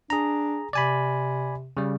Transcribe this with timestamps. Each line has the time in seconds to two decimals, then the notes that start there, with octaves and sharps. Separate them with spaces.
0.10 D4 G#4 A#5
0.73 C3 D5 G#5 B5
1.77 C#3 G3